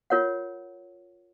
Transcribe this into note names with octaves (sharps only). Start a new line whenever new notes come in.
F4 A#4 C#5 F#5